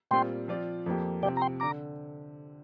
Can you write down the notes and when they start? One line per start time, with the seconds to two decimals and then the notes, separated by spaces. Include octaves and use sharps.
0.11 A#2 G3 C4 F4 G5 C6
0.48 F3 C4 F4 D5
0.86 F2 F3 A#3 G4
1.23 C3 F3 C4 D5 G5
1.37 A#5
1.42 G5 C6
1.60 D3 A#5 D6